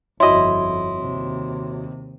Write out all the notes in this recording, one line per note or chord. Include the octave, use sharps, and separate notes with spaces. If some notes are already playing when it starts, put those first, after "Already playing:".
G1 F2 E4 F#4 C#5 D#5 C6
D#2 C3